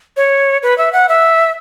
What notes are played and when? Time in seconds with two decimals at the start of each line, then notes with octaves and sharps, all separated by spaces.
0.17 C#5
0.63 B4
0.78 E5
0.93 F#5
1.09 E5